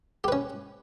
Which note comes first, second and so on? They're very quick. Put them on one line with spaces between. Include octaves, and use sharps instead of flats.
G4 B4 C#4